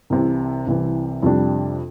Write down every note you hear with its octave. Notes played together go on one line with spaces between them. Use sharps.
C2 C3 E3
C2 C3 E3
F2 C3 G3 D4